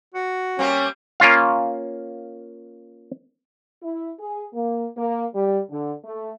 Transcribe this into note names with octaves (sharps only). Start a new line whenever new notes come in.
F#4
G3 A#3 C4 C#4
A#3 C#4 F4 F5
E4
G#4
A#3
A#3
G3
D3
A3